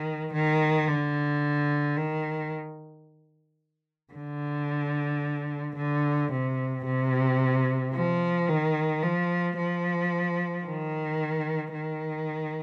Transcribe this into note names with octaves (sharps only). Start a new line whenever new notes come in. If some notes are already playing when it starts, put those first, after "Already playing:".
Already playing: D#3
D#3
D3
D#3
D3
D3
C3
C3
F3
D#3
F3
F3
D#3
D#3